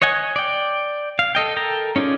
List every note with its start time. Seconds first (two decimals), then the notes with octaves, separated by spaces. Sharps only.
0.02 C#5 D#5 F#5 G#5
0.36 D5 G5
1.19 F5
1.35 A4 D#5 G5
1.57 A4 A#4 G5 A#5
1.96 C#4 D#4 F4 G#4 D5